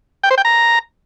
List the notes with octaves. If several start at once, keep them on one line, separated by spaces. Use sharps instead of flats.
G5
C5
G5
A#5